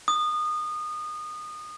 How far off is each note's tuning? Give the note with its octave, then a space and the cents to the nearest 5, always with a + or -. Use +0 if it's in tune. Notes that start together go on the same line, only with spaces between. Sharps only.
D#6 -25